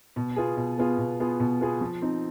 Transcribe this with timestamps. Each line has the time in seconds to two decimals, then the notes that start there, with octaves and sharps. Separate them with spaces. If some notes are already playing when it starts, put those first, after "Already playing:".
0.16 B2
0.36 B3 F4 G#4
0.57 B2
0.78 B3 F4 G#4
0.98 B2
1.20 B3 F4 G#4
1.40 B2
1.61 B3 F4 G#4
1.81 F3
2.02 C4 D#4